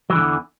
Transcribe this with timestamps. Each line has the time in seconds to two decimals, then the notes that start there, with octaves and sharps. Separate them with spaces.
0.10 F#3
0.12 E3
0.15 D3
0.18 G2
0.21 E2